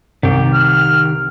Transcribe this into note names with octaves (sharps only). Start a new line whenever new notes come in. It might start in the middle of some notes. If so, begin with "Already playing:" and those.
C2 D#3 G4
F6